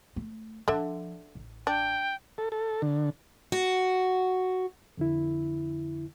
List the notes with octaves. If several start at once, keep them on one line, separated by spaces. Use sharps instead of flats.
A3
D3 F3 D4 E5
A1
D4 G5
A4
A4
D3
F#4
F2 D3 E4